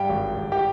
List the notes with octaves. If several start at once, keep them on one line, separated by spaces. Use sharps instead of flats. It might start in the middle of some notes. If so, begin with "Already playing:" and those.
Already playing: G2 G4 G5
G#1
G#1
G4 G5